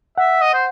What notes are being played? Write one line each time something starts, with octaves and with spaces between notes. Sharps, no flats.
E5 F#5
D#5
C5